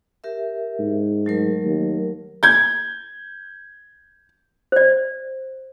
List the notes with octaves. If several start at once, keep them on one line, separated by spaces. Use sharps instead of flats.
G4 A#4 E5
G#2
F#3 A3 A#4
D#2
G6 G#6
C5 D5